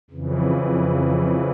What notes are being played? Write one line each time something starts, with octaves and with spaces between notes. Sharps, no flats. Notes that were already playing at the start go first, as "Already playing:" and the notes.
F2 C#3 E3